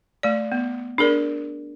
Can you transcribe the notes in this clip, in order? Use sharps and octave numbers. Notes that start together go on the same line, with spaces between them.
A3 D5
B3
D4 G#4 A#4 D5